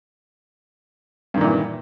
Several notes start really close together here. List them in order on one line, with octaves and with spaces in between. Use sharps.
G2 D#3 A#2 E3